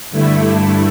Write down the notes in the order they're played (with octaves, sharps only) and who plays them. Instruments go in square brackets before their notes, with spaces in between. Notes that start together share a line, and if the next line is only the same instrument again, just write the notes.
[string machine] G2 D3 A3 E4